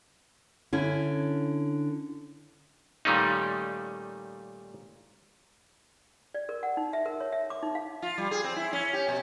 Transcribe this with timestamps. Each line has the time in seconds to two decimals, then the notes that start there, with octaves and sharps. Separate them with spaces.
0.73 D3 C#4 E4
3.05 A#2 D#3 G3 A3 C#4 D#4
6.34 D5
6.49 A#4
6.63 F#5
6.77 D#4
6.93 E5
7.06 A#4
7.20 C#5
7.32 E5
7.50 D6
7.62 D#4
7.75 F5
8.02 F4
8.18 G3
8.31 G#4
8.44 C4
8.56 E4
8.73 C#4
8.93 G4
9.08 B2